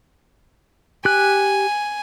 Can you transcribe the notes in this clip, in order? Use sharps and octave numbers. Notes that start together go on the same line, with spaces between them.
G4 G#5 F#6